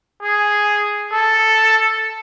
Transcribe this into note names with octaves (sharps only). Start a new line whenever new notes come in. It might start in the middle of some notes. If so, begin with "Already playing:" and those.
G#4
A4